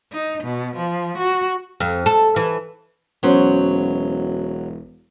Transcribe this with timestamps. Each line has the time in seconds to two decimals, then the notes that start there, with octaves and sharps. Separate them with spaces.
0.12 D#4
0.43 B2
0.76 F3
1.17 F#4
1.80 F2
2.06 A4
2.36 E3
3.23 E1 F#3 B3 C#4 C5